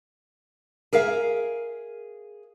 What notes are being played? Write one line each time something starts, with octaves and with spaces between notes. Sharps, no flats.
G#4 A#4 E5 F5